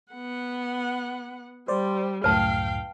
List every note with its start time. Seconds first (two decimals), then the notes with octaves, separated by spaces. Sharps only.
0.12 B3 F#5
1.68 G3 C5 D5
2.24 C#2 F#2 A2 B4 F5 G5 A5